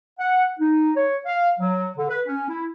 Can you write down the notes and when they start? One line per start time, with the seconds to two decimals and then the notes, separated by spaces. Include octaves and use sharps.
0.19 F#5
0.60 D#4
0.96 C#5
1.26 F5
1.59 F#3
1.97 D3
2.08 B4
2.27 C#4
2.48 E4